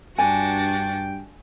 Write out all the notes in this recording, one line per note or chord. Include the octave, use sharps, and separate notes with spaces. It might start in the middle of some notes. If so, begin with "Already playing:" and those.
G2 D4 F#4 G5 G#5 A6